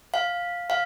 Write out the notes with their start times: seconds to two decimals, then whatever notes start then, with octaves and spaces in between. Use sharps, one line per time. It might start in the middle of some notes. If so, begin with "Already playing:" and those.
0.14 F5
0.70 F5